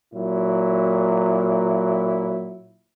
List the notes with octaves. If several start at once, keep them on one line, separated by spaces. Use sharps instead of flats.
A#2 F#3 E4